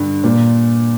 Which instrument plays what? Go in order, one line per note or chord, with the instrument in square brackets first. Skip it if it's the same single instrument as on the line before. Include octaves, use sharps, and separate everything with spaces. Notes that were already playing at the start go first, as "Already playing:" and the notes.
Already playing: [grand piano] G2 D3
A#2